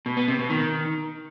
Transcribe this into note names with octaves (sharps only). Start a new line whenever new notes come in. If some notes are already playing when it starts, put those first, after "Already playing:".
B2
B3
C3
B2
D#3